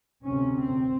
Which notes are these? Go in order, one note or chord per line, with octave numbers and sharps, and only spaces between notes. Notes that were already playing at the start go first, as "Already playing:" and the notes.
D2 C3 C#4
C4